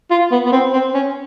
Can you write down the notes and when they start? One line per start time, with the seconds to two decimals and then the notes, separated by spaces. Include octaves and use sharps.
0.11 F4
0.32 B3
0.46 B3
0.52 C4
0.73 C4
0.94 C#4